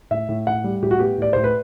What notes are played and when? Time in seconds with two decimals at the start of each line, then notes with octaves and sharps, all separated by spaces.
0.11 A2 E5
0.29 A2
0.47 A2 F#5
0.64 G3
0.82 A2 G4
0.91 F#4
1.00 B3 G4
1.18 A2 D5
1.33 A2 C5
1.44 B4